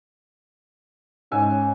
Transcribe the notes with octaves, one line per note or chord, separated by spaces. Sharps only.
G#2 C#4 G#5 E6